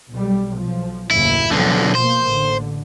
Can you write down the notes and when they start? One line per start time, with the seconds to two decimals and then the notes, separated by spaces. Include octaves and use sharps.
0.12 B1 G3
0.57 B1 F3
1.11 F#1 D#2 A2 E4
1.52 B1 D3 F3
1.95 B2 F3 A#3 C5
2.26 A1 D3